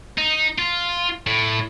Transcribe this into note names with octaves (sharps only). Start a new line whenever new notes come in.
D#4
F4
A2